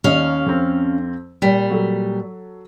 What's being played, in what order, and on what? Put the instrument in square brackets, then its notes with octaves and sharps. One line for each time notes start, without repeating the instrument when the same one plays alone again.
[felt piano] D#2 D#5 [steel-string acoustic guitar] C#4 F5
[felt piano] F2 C4
[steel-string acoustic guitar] A#2 G3 [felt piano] B6
[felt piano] F#3 A4